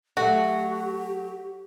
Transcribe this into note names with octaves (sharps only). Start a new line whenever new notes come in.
F#3 A3 F#4 G4